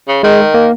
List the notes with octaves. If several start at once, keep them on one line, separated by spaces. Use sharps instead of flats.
C#3
D#3 G#3
A#3